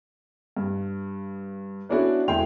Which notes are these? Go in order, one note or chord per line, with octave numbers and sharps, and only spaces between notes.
G2
B3 C#4 D4 E4 F#4 A4
E1 A3 E4 G5 C6 F7